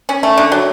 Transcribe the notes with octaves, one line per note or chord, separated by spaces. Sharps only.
C#4
A3
D3
F#3